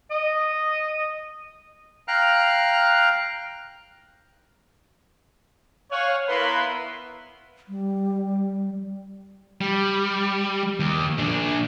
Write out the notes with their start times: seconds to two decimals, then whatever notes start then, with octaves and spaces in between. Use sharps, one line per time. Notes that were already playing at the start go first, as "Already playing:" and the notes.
0.11 D#5
2.08 F5 G5 A#5 F6 F#6
5.92 C#5 F5 F#5 G#5 F6
6.29 B3 E4 A#4 B4 C6
7.69 G3
9.61 G3
10.80 D#2
11.18 A#2 D4